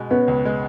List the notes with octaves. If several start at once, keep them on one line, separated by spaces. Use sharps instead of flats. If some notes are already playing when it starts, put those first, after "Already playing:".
Already playing: B2 G#3
B3 C#4
C#2
G#3